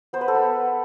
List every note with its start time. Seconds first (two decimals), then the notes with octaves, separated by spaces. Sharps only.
0.13 B3 C5
0.21 B4
0.28 A4
0.35 B4
0.43 B3